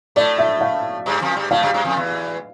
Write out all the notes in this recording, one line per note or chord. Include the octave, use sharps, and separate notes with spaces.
A2 A3 D5
E5
F5
G2 G3
F2 F3
G2 G3
A2 A3 F5
G2 G3
G2 G3
F2 F3
E2 E3